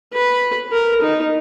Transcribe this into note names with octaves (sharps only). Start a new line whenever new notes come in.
B4
A#4
D#4